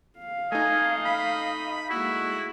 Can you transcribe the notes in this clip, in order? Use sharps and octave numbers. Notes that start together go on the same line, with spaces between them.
F5
A3 D#4 D#5 G#5
B5
G#3 A#3 E4 F#4